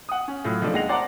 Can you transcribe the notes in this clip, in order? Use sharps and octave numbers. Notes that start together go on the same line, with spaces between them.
F#5 D#6
C#4
A2 F#3 F4
D#3 F3 G#3 A3 D4
D#2 G#3 F#5 A#6 C7 F7
C5 D5 F#5 A5 A#5 D6